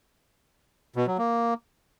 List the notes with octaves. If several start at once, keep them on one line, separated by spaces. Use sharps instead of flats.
B2
F#3
A#3